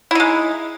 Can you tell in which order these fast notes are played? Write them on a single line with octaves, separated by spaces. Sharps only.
E4 D#4 G#3